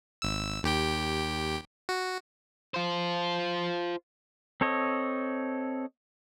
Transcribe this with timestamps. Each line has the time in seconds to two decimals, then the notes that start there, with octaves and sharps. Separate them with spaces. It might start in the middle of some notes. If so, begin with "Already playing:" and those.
0.22 G#1 E6
0.63 D#2 G4 G5
1.89 F#4
2.74 F4 C5
4.61 C4 A4 C#5 D#5